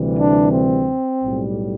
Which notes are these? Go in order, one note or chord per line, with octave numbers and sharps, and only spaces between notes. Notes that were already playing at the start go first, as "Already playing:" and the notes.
Already playing: D2 C3 E3 G3
D4
C4
B1 A2 G3